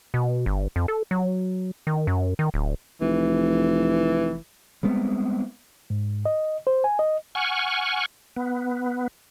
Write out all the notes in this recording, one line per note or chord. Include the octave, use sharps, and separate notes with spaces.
B2
G1
F2
A4
F#3
D#3
F#2
D#3
D1
F1 E3
G3 G#3 B3 C4
G#2
D#5
C5
G#5
D#5
F#5 G#5 C#6 F6
B3